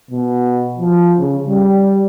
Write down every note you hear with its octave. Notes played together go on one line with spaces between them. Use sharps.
B2
F3
C#3
G3